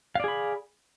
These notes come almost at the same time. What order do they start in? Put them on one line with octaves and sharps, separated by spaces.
F5 D5 G#4 B5